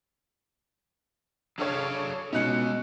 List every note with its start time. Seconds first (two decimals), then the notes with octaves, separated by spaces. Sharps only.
1.58 F#3 D4 G#4 A4 C#5 F5
2.33 B2 G#3 C#4 D#4 F#6 C#7